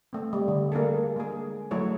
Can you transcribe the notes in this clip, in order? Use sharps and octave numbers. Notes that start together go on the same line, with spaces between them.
A3 C4
G3
D3
A#3 D4 G#4 A4
G#3 A#3 G#4
F#3 A3 E4 G#4 C#5